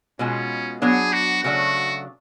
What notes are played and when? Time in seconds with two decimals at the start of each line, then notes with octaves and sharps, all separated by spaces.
0.19 B2 G#3 B3 C#4 F4
0.82 F#3 B3 D4 G#4
1.13 F#4
1.44 C#3 F#3 A3 D4 F#4